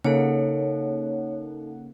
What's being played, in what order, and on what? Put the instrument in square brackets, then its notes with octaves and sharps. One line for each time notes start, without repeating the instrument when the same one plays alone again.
[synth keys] C#3 A#3 F#5 [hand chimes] D#4 A4 [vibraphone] C#5